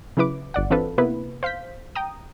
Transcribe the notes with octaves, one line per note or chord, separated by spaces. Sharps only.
C#3 F#3 E4 B4 D6
G1 D5 F#5
E3 C4 D4 F4 A4 B4
C3 A#3 B3 E4 B4
C5 F5 G6 B6
G5 A#5 D#6